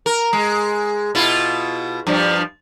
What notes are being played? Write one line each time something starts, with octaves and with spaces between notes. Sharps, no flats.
A#4
G#3
B2 E4 F4
G2 F3 G3